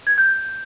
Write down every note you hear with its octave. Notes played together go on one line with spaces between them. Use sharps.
G#6
G6